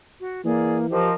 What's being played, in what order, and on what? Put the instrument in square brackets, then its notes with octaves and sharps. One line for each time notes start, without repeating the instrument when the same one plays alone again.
[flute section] F#4
[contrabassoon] E3 [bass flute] A#3 [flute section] G#4 D5
[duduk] F3 [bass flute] G4 [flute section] A#4 C5 D#5